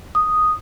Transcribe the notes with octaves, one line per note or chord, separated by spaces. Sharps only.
D#6